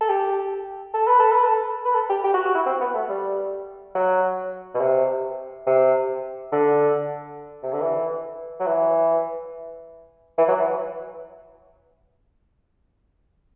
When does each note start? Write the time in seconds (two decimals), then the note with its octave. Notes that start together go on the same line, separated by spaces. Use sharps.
0.01 A4
0.09 G4
0.94 A4
1.07 B4
1.19 A4
1.32 B4
1.44 A4
1.85 B4
1.95 A4
2.10 G4
2.24 G4
2.34 F#4
2.45 F#4
2.55 E4
2.66 C4
2.81 B3
2.94 A3
3.10 G3
3.95 F#3
4.74 B2
4.81 C3
5.67 C3
6.52 D3
7.63 C3
7.73 D3
7.81 E3
8.60 F#3
8.67 E3
10.38 E3
10.48 F#3
10.60 E3